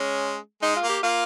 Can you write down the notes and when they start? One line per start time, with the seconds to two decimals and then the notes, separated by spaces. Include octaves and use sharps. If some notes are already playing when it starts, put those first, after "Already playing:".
Already playing: G#3 C#4
0.62 G#3 D#4
0.76 F4
0.83 A#3
0.89 G4
1.03 A#3 F4